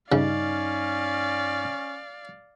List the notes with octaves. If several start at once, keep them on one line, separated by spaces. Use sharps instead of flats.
G2 C#3 C#4 D#4 D5 F5